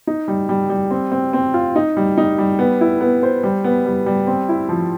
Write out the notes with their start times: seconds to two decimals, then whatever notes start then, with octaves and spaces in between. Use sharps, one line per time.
0.07 D#4
0.28 G3
0.49 G3
0.70 G3
0.91 C4
1.12 C4
1.33 C4
1.54 F4
1.76 D#4
1.97 G3
2.18 D#4
2.38 G3
2.59 B3
2.81 E4
3.01 B3
3.23 C5
3.43 G3
3.64 B3
3.86 G3
4.06 G3
4.27 C4
4.49 E4
4.69 F3